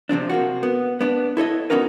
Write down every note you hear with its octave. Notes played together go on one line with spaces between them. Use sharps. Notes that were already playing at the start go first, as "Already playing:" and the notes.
C3 F3 C4 D4
C3 A#3 F#4
B3
B3 D4
E4 A4 C#5 D#5
B3 C#4 D#4 F#4 A#4 B4